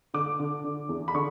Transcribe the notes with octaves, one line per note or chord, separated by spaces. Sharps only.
D3 D6
D3
D3
E2
B5
D3 C#6